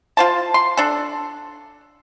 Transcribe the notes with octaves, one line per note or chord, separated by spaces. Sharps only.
F4 C5 A5
C6
D4 A4